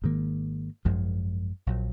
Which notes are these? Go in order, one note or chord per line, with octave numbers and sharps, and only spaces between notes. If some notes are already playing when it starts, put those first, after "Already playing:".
G#1 G#2 D#3 A#3
G#1 F#2 F3 G#3
A#1 A#2 F#3